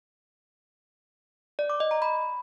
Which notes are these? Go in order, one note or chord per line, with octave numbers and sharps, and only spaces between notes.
D5
D6
D#5
A#5
B5